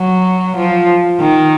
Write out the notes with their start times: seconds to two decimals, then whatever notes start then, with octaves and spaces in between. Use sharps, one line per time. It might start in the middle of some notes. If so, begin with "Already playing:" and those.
Already playing: F#3
0.57 F3
1.20 D#3